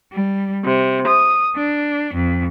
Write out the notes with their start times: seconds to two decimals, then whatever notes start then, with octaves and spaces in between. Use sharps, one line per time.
0.12 G3
0.64 C3
1.05 D#6
1.55 D4
2.13 F2